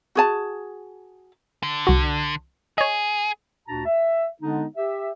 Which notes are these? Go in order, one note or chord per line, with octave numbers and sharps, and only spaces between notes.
F#4 G#4 A5
D3
C2 F#4
G#4 C#5 D#5
D2 A#2 D4 F#4 A5 A#5
E5
D3 G#3 B3 D4 D#4
G4 E5